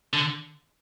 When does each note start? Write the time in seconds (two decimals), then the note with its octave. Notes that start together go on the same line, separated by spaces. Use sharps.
0.13 D3